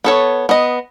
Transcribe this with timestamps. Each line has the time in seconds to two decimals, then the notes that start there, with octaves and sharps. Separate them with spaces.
0.04 B3 A4 C#5
0.49 B3 D#5